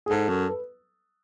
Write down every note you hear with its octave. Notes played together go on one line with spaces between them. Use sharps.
G#4
G#2 A4
F#2
B4